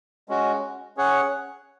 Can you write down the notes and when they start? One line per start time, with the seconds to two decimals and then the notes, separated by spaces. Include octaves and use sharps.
0.29 G#3 C#4 F#4
0.97 C#4 G#4 C#5 F#5